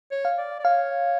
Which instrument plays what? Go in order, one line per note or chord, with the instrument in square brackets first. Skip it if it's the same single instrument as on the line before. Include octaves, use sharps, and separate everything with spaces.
[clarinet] C#5
[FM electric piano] F5
[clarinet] D5
D5
[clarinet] C#5 [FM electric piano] F5